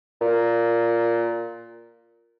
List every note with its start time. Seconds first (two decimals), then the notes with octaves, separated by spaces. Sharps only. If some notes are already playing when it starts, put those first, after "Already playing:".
0.21 A#2